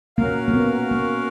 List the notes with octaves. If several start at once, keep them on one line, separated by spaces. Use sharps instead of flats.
A#3 C#4 F#4 A#4 F5
A#3
B3
A#3